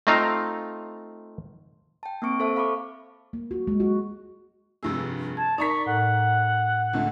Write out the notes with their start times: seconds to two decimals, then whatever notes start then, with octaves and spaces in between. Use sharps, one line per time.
0.07 A3 C4 D#4 F4 F5 A#5
2.03 G5 A5
2.22 A#3 C4 C#6 D7
2.40 A4 C5 E5 A5
2.56 F5 B5 C#6 D6
3.33 A#3
3.51 F#4
3.67 G#3
3.80 F#4
4.83 F1 G2 G#4 E6
5.37 A5 G#6
5.58 D#4 A#4 D5 A#5 C#6 B6
5.86 A2 F#5
6.94 C#2 D3 A3